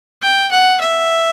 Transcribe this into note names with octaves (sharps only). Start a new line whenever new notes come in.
G5
F#5
E5